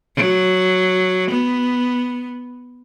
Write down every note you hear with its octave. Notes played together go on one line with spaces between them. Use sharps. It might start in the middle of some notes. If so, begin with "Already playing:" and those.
F#3
B3